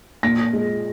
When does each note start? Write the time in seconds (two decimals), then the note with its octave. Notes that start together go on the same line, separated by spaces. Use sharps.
0.23 A#2 A#6
0.53 G#3